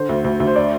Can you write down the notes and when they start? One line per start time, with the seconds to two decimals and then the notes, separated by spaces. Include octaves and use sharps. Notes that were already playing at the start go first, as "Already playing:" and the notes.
Already playing: D3 C5
0.09 D2
0.24 D2
0.40 D2
0.47 C5
0.56 D5